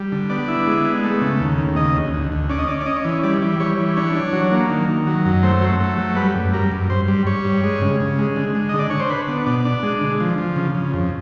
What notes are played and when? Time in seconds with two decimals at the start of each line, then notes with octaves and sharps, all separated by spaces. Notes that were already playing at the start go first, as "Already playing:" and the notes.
Already playing: G3
0.12 D3
0.30 B3 D5
0.48 E4
0.66 G#3
0.85 B3
1.04 A3
1.21 C#3
1.40 D#2
1.58 D#2
1.76 C#3 D#5
1.95 D2
2.13 D2
2.32 D2
2.49 C#4 D5
2.59 D#5
2.68 C#4 D5
2.81 D5
2.86 C#4 D#5
3.05 E3
3.23 G3 D5
3.42 E3
3.60 G3 C#5
3.78 E3
3.97 D4 C#5
4.15 D4
4.33 F#3
4.52 A#3
4.69 D#3
4.88 D#3
5.07 F#3
5.26 F#2
5.43 A3 C5
5.61 F#3
5.80 A3
5.98 F#3
6.16 G3 B4
6.36 F#2
6.53 G3 A#4
6.71 F#2
6.90 G2 C5
7.08 G3
7.27 G3 C#5
7.45 G2
7.63 G#3
7.82 C#3
8.00 C#3
8.19 G#3
8.36 D3
8.55 G#3
8.69 D3 D#5
8.79 D5
8.90 D3 C#5
9.00 C5
9.10 D4 B4
9.28 B3
9.46 B2 D5
9.65 D4
9.83 G#3
10.01 D3
10.20 F3
10.38 F3
10.56 C#3
10.75 C#3
10.93 F2